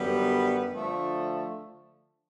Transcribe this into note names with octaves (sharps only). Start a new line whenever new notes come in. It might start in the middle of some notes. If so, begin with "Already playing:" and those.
Already playing: F#2 D3 G3 B3
D3 F3 A3